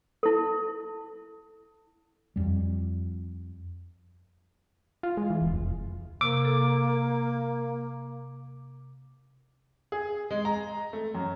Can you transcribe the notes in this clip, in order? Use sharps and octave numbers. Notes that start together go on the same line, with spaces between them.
E4 A4
F2 G3
F4
G#3
E3
D1
F1
C3 A#3 D6
A4
G#4
G#3
A#5
A3
F#2